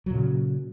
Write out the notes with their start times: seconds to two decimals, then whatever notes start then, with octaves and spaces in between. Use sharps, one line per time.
0.06 F#3
0.10 A#2
0.14 C#3